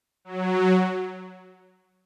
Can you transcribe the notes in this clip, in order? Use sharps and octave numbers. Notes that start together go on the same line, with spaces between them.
F#3